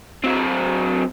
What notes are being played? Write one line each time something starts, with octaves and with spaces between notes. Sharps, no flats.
F#3 C4